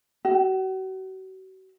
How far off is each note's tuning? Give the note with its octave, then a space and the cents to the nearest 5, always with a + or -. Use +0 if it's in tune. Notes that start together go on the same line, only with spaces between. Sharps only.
F#4 +40